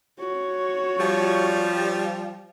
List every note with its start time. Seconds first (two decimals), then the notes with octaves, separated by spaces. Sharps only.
0.19 F#4 C#5
0.99 F3 G3